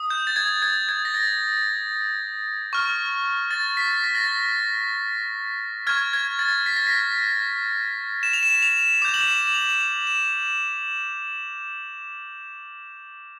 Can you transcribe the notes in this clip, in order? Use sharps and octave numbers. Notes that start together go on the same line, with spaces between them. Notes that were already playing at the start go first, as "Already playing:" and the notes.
Already playing: D#6
G6
A6
G#6
G#6
G#6
A#6
A6
C#6 F6
A6
B6
A#6
A6
A#6
C#6 F6 G#6
G#6
A6
B6
A#6
B6
E7
F7
E7
F7
D6 G6 E7
F#7
F7
E7
F7
F7
E7